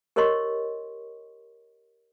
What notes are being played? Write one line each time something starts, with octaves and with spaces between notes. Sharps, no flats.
G4 A#4 C#5 D#5 C6 C#6